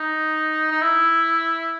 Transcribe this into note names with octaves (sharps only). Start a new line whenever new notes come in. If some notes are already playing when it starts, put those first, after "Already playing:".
Already playing: D#4
D#4
E4